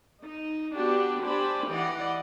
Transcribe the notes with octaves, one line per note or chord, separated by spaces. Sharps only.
D#4
B3 D4 F#4 G4
D4 G4 C5 G#5 B5
E3 D5 D#5 F#5